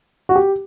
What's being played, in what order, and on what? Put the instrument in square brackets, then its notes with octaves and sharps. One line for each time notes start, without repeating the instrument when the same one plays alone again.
[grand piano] F#4
G4